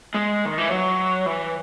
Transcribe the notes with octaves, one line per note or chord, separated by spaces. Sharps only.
G#3
D#3
E3
F#3
E3